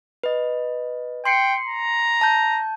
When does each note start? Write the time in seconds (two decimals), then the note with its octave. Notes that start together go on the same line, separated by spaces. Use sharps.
0.24 B4 D#5
1.25 G5 C6 C7 C#7
1.67 A#5
2.21 A5 G6